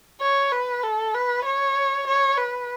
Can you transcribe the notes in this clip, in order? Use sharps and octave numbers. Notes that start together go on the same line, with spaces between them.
C#5
B4
A4
B4
C#5
C#5
B4